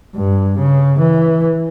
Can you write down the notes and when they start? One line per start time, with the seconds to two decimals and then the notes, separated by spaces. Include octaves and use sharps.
0.15 G2
0.59 C#3
1.00 E3